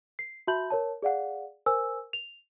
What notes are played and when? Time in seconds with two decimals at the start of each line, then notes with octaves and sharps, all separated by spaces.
0.19 C7
0.47 F#4 E5 A5 B5 G6 F#7
0.70 A#4 C#5 A5
1.02 G#4 D5 F5 F#5
1.66 A#4 C5 G#5 E6
2.13 F7